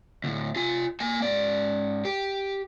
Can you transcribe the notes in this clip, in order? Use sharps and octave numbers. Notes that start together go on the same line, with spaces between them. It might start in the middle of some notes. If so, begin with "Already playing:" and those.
D2 A2
F4 G#5
A#3 G#5
G#2 D5
G4